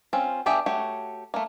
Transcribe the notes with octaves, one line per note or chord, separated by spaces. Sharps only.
C4 C#4 F4
B3 D4 G4 G#4 E5
A3 F#4 G4 C#5
A3 A#3